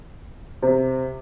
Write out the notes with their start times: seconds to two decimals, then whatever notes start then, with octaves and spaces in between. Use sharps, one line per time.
0.63 C3